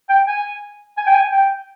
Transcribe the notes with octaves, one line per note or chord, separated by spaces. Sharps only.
G5
G#5
G#5
G5
G#5
G5